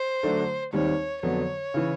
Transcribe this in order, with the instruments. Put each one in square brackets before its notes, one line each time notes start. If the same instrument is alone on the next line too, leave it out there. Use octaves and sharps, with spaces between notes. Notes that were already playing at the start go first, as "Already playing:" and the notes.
Already playing: [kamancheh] C5
[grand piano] D3 F#3 A3 D4 F#4
[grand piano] D#2 D#3 G3 C4 [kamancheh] C#5
[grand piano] F2 D3 F#3 B3 [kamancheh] C#5
[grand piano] C#3 E3